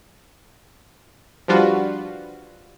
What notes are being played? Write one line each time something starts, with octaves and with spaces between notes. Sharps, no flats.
F3 G3 D4 F4 F#4 B4